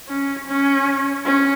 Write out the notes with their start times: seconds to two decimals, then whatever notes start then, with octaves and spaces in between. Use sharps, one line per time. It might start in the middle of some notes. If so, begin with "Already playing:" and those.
0.09 C#4
0.47 C#4
1.25 C#4